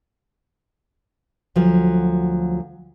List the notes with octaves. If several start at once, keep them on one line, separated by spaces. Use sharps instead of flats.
D2 F3 F#3